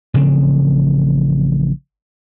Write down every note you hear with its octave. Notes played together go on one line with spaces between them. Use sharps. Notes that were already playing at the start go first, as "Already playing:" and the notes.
A1 C#3 F3 C4